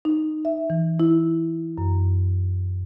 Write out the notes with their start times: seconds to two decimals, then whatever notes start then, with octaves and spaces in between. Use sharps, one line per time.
0.05 D#4
0.45 E5
0.70 E3
1.00 E4
1.78 F#2